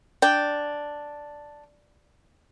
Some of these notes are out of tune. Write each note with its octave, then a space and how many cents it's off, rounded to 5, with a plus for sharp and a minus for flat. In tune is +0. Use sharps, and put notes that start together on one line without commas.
D4 +0 G5 -5